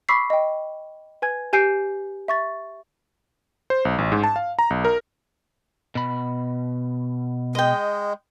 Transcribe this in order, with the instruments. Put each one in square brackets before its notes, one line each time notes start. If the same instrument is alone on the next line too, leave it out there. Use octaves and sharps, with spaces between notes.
[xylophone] B5 C#6 D6 E6 B6 C7
D#5 G5
B4 G#5 G#6
G4 G#5 G6 C7 D7
E5 C#6 A6
[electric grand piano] C5
B1
A1
G#2
A5
F5
A#5
B1
A#4
[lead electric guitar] B2 B5
[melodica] G#3 [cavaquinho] D#5 G5